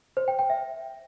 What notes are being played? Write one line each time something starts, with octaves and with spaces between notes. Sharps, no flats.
C5
G5
G5
E5